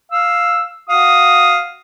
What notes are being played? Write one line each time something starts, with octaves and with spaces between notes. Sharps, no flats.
F5 E6
F#4 F5 D#6